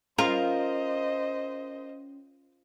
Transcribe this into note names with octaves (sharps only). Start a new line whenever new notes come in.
C#4 F4 A#4 C5 D#5